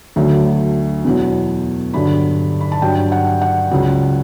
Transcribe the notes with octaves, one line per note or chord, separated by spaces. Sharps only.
D2 D3 F#3
E2 B2 F#3
G2 D3 F#3 B5
B5
A5
G2 F#3 G5
F#5
F#5
C#2 C#3 F#3